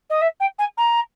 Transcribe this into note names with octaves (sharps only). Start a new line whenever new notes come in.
D#5
E5
G5
G#5
A#5